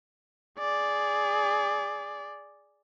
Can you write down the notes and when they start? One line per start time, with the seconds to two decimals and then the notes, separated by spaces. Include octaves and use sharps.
0.59 G#4 D5